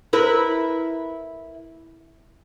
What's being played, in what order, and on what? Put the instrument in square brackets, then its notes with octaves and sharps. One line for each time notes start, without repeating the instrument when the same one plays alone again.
[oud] E4 A#4 B4